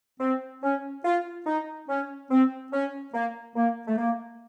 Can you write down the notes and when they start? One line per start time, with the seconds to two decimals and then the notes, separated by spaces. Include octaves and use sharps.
0.20 C4
0.63 C#4
1.05 F4
1.46 D#4
1.89 C#4
2.31 C4
2.73 C#4
3.14 A#3
3.56 A#3
3.88 A3
3.98 A#3